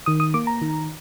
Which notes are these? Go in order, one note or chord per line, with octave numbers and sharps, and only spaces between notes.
D#3 D#6
D#6
A#3 D6
A#5
D#3